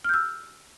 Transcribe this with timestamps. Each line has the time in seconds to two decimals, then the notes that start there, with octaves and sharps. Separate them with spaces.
0.04 F6
0.09 G6
0.14 E6